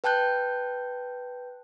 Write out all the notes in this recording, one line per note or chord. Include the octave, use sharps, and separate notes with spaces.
B4 G5 A5 F#6 G6